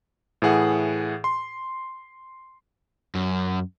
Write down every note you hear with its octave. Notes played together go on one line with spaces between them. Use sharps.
A2 E3 G#4 F#5
C6
F#2